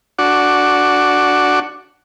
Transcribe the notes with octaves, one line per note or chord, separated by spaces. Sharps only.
D4 F#4